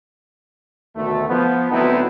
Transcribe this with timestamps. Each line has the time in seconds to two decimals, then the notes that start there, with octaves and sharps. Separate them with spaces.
0.96 D2 B2 D#3 A3
1.29 F3 B3
1.71 D2 F#3 B3 C4 D#4 E4